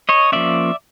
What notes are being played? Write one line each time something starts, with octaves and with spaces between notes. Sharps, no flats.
C#5 D#5
F3 A#3 C#4 D5 E5